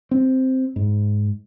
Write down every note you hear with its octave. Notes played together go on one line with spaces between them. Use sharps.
C4
G#2